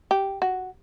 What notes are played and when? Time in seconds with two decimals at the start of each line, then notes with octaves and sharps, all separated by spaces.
0.11 G4
0.42 F#4